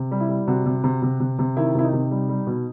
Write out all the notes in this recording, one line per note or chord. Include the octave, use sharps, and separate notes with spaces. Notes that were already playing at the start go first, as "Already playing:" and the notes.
Already playing: C3
G3
E4
G3
C3 F#4
C3
C3
C3
C3
C3
D#3 E4
C3 E4
D#4
C3
G3
G3
B2